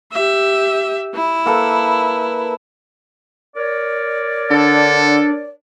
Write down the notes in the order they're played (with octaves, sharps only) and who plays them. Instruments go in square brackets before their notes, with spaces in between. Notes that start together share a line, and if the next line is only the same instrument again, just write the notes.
[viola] G4 E5
E4
[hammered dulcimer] A#3 A4 B4
[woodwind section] A#4 C#5 D5
[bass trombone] D3 [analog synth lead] D4 [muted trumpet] A4